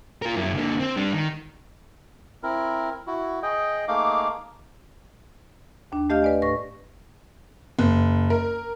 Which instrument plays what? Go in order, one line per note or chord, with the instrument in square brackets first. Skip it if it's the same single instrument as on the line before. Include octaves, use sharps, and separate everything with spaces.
[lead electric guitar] F4 A#4
F#2 E4
D3 A#3
C4
G3 D4
D#3
[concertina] C4 E4 A#4
E4 F#4
G#4 D#5 G5
A3 A#3 D#4 G#4 F5 D6
[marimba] D#2 D4
A3 G4 D#5 F5 F6 G6
B4 D5 G#5
A2 B4 C#6 A#6
[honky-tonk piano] F#1
A#4